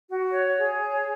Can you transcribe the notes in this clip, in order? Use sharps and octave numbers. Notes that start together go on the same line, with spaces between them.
F#4
C#5
G#4
C#5